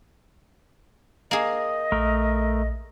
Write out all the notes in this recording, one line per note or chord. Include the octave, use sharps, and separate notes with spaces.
A#3 G#4 D#5
A#1 A3 A#4